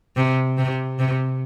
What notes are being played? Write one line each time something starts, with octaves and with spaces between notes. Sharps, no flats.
C3
C3
C3